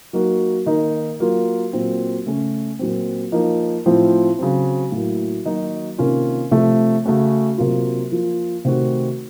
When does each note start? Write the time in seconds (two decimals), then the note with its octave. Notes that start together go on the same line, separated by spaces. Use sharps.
0.13 F#3 A#3 D#4 F#4
0.66 D#3 A#3 D#4
1.20 F#3 A#3 F4
1.73 A#2 F#3 C4 F4
2.26 C#3 A3 C#4
2.79 A#2 F#3 C4
3.32 F3 A#3 D#4
3.86 A2 F3 C4 F4
4.39 C#3 F#3 C4
4.92 A2 F#3 A#3
5.45 D#3 F#3 A#3 D#4 F#4
5.98 C3 D#3 A#3 C#4 F4
6.51 C3 F3 A3
7.05 C#3 A3 C#4 F#4
7.58 C3 F#3 A#3 F4
8.12 F3 A#3 F4
8.65 C3 D#3 A3 C4 F#4